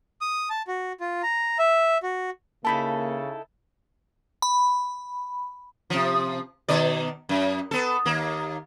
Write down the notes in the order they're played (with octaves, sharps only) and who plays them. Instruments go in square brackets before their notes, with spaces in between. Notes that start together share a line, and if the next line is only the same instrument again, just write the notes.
[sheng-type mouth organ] D#6
A5
F#4
F4
A#5
E5
F#4
[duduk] C#3 [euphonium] A#3 [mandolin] D#4 E4 A4 [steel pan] A5 B5
[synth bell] B5
[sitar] C3 F3
B2 D#3 D5
F#2
B3 A4
D#2 A#3